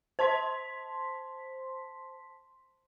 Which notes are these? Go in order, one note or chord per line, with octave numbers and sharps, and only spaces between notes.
C5 A5 C6 B6